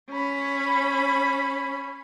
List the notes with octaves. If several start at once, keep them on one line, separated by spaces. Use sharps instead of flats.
C#4 B5